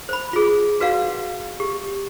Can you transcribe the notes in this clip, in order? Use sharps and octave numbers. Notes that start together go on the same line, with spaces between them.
C5 B5
F4 G#4
F#4 B4 D5 F5 F#5
G4